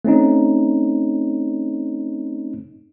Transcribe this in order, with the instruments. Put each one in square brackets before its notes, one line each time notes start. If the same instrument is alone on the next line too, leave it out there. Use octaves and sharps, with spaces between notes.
[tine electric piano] A3 C4 C#4 D#4